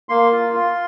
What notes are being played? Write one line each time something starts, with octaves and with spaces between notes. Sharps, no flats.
A#3 C6
F4
F4